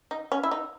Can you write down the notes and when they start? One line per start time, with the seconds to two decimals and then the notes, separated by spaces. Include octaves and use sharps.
0.11 D#4
0.32 C#4
0.43 E4
0.51 D#4